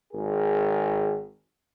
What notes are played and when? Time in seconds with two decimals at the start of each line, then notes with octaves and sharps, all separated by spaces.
0.13 G#1 G#4 A#4